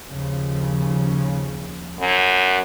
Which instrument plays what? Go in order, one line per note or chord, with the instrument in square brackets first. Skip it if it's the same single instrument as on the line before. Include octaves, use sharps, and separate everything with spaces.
[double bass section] D#2 C#3 F3
[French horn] F#2